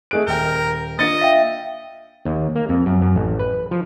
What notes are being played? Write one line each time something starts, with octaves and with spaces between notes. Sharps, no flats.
A3 G#4 D#5 F#6 D7
D#1 A#4 G5 G6
A#5 G6
A#3 D4 F4 D#5 A6 C#7
E5 F5 G5
D#2
A#3
F2
F#2
F#2
A1
B4
F3